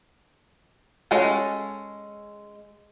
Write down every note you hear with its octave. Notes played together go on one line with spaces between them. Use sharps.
G#3 C#4 G#4 A4